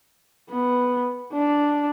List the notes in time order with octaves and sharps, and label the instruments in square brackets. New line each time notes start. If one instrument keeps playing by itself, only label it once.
[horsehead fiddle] B3
D4